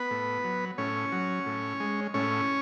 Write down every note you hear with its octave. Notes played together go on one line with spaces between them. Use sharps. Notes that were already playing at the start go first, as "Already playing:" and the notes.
Already playing: B3 B4
A2
F#3
A2 C#4 C#5
F#3
A2
G#3
A2 C#4 C#5